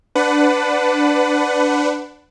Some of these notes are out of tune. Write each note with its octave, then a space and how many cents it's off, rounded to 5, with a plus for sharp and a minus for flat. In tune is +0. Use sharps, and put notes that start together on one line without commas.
D4 +0 B4 +20 F#5 +0